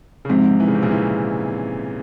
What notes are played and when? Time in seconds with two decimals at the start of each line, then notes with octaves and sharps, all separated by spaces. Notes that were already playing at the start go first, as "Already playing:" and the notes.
0.25 C#3
0.29 G#2 C3 F3 G#3 C4
0.60 E3
0.68 C#3
0.75 C3
0.82 A#2 C#3
0.91 C3 E3